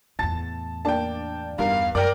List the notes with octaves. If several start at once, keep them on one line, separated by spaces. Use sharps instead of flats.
E2 A2 A5 A6
A#3 D4 D5 G5 A5
E2 G2 D#4 A#4 F5
F#2 A#4 D5 G5 D6 F6 D7